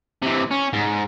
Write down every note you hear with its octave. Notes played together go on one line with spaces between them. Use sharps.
C3 E3
C#4
G#2